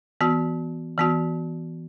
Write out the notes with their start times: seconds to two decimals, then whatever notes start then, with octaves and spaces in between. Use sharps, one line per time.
0.21 E3 B3 F#4
0.98 E3 B3 F#4